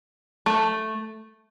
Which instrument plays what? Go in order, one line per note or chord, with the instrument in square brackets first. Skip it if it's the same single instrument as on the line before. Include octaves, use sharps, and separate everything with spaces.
[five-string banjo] A3